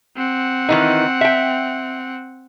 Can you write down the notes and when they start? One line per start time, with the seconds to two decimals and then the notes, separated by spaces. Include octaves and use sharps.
0.17 C4 F#5
0.69 D#3 E3 D#4
1.21 E5 G5